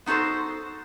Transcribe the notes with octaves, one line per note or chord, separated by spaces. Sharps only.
B3 D#4 F#4 A4 C5